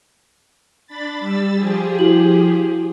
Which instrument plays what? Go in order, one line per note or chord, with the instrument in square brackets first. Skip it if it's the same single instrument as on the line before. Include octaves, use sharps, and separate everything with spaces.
[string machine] D4 B5 A6
G3 E6 A6
F3 G4 G#4
[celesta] E4 F#4 F#7